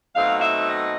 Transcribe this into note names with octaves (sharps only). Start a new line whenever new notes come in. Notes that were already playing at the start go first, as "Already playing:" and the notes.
B2 F#3 A3 C4 D#4 F5
F5
E5
D#5